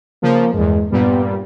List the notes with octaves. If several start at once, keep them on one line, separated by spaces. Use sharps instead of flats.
C#3 F3 A#3
E2 G2 G#3
G2 A#2 G3 B3